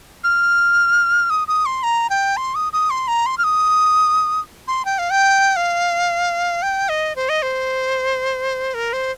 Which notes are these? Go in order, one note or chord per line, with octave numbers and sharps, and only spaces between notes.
F6
D#6
D#6
C6
A#5
G5
C6
D#6
D#6
C6
A#5
C6
F6
D#6
C6
G5
F5
G5
F5
G5
D#5
C5
D#5
C5
A#4
C5